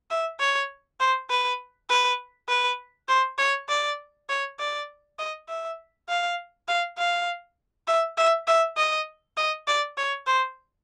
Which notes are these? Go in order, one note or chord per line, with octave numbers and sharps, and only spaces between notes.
E5
C#5
C5
B4
B4
B4
C5
C#5
D5
C#5
D5
D#5
E5
F5
F5
F5
E5
E5
E5
D#5
D#5
D5
C#5
C5